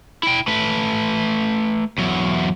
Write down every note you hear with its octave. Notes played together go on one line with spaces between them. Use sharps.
E4 G5
A3 B4
E2 F#3